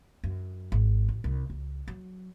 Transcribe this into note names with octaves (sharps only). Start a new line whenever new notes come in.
F#2
G#1
A1
C2
C#2
F#3